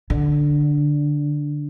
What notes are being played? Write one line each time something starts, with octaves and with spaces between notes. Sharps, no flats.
D3